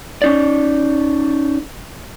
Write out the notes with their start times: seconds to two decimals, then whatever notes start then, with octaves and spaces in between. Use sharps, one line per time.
0.22 C#4 D#4 D5